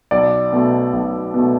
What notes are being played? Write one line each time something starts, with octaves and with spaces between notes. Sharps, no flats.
B1 D5
B2 A3
B1
B2 A3